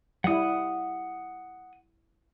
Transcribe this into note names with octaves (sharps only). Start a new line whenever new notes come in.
G3 E4 F#5 D#6